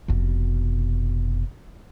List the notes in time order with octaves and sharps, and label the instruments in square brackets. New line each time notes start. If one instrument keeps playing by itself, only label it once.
[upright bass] F1 B2